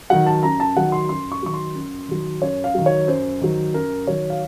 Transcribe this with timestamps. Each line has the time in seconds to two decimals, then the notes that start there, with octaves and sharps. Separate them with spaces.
0.10 D#3 F#3 F#5
0.26 A5
0.43 F#2 A#5
0.60 A5
0.76 D#3 F#3 F#5
0.92 C6
1.09 F#2 C6
1.32 C#6
1.43 D#3 F#3 C#6
1.54 C6
1.75 F#2
2.09 D#3 F#3
2.42 F#2 C#5
2.64 F5
2.74 D#3 F#3
2.86 C#5
3.07 F#2 C5
3.41 D#3 F#3
3.74 F#2 A#4
4.07 D#3 F#3 C#5
4.30 F5